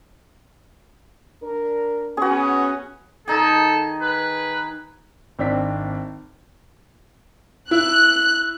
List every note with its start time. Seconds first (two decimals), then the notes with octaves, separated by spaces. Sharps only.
1.42 D4 A#4
2.17 B3 C#4 F#4 G#4
3.28 D#3 D#4 G#4 A4
4.02 B4
5.39 G#1 C4 D4 B6
7.71 E4 F#6